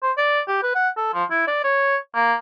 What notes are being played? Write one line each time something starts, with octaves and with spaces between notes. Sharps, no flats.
C5
D5
G4
B4
F#5
A4
F3
E4
D5
C#5
A#3